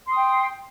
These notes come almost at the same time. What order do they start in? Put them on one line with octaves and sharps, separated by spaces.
C6 D#6 G5